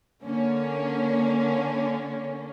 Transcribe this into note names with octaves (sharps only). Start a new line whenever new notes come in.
D3 A#3 C#4